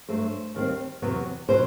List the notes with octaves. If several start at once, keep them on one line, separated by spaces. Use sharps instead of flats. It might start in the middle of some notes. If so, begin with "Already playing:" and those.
G2 F#3 A3 C5
D#2 D#3 G3 C4
E2 C3 F#3 B3
B2 F#3 C5